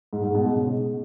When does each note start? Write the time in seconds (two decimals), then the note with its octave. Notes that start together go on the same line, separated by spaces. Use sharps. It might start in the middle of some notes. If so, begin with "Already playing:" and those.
0.13 G#2
0.24 G#2
0.34 B2
0.45 G#2
0.56 C#3